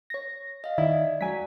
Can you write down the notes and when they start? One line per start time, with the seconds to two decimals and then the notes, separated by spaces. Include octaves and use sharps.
0.10 C#5 A#6
0.64 D#5 F5
0.78 D#3 E4 D5
1.21 F#3 G#5 B6